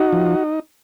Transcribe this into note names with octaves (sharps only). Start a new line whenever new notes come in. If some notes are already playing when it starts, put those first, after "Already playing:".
Already playing: D#4 F#4
F3